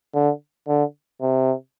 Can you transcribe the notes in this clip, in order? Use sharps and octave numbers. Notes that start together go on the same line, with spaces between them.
D3
D3
C3